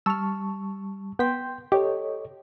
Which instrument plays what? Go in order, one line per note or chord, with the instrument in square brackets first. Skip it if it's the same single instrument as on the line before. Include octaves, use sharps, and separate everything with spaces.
[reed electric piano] G3 A5 C#6 [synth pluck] E6 F6
[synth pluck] B3 B6 [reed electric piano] G5 C6 G6
[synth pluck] G4 [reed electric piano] A4 C#5 D#5